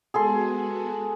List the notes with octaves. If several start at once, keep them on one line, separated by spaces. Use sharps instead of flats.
G#3 B3 F#4 G#4 A4 C6